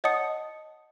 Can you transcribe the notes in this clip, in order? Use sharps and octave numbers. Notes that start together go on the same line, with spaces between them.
C#5 D#5 F#5 A5 D#6 C#7